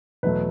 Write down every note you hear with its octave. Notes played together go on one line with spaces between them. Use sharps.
E2 B2 F#3 A3 B4